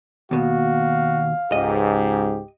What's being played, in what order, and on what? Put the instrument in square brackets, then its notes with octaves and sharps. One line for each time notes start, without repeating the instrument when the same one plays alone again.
[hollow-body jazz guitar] D#2 B2 [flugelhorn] F#4 [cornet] F5
[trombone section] C#2 G#2 [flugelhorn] G4 [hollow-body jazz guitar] D#5